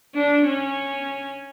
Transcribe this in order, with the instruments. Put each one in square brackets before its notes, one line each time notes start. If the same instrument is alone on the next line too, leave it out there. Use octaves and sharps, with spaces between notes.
[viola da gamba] D4
C#4